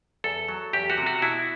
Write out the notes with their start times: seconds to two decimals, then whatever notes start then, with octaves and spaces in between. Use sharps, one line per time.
0.24 E2 A4
0.49 F#3
0.73 E2 G4
0.90 F#4
0.98 C3
1.06 F#4
1.22 B2 E4